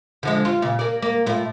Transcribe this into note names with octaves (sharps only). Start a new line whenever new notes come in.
D3 F3 G#3
F4
A#2 C#3
A#3 D5
A#3
A2 F4